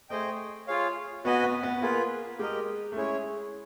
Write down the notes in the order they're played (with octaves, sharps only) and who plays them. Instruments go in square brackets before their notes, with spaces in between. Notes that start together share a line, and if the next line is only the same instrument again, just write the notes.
[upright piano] A3 [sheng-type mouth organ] G#4 C5 D#5 G5
[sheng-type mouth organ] F4 G#4 C#5 F5
[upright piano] B3 [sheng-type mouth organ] F#4 B4 D#5 G#5
[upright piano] B3
B3
[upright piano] A#3 [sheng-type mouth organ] F4 G#4 B4
[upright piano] G#3 [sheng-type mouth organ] G4 A#4 D#5
[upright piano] A3
[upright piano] G#3 [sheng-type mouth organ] C#4 E4 G#4 C#5